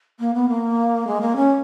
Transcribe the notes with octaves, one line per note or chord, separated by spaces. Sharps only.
A#3
B3
A#3
G#3
A#3
C#4